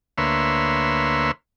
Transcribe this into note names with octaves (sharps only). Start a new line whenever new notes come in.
D2 A#3 B4 C#5 E5 C6